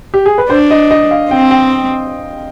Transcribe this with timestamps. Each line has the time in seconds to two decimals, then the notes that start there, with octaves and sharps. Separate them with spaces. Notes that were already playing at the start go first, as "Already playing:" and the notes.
0.14 G4
0.26 G#4
0.38 B4
0.50 D4 C5
0.71 D#5
0.91 D#5
1.11 F5
1.31 C4 G5
1.51 G5